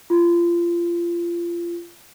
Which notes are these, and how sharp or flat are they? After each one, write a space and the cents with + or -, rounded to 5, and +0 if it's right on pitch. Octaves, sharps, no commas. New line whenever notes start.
F4 -25